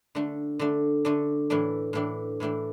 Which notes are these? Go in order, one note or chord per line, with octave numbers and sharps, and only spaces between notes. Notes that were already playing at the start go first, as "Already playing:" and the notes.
D3 A3 D4
D3 A3 D4
D3 A3 D4
A2 E3 A3 D4
A2 E3 A3 D4
A2 E3 A3 D4